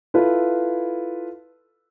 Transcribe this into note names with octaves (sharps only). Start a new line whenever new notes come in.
E4 F4 A4 B4